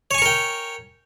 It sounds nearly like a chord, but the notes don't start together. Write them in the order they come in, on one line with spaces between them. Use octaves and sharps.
C#5 G#5 C#6 A#4 G5